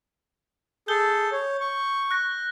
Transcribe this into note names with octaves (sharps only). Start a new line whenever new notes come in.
G#4 A4 G6 G7
C#5
C#6
F#6 A#6